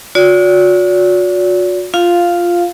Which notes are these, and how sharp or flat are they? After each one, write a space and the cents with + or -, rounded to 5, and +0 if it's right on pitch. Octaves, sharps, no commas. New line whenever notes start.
F#4 -40 D5 -40
F4 +0 F5 +0